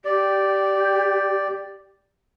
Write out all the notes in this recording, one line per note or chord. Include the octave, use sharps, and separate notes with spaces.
G4 D5